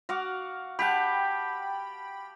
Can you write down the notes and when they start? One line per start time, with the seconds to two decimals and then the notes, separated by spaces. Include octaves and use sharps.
0.09 F#4 F5 D6
0.79 G4 F#5 G5 A5 B5